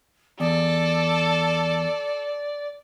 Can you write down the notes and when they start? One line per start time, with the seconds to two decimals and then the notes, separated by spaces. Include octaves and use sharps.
0.40 E2 A4 D5